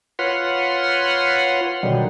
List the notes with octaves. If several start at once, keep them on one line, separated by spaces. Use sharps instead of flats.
F4 B4 C#5 F#5 C6
B2 D3 D#3 F#3 G3